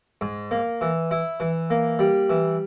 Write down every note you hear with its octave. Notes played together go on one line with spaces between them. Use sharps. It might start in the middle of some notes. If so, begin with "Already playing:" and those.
G#2
A#3
E3
E4
E3
A#3
G3
E3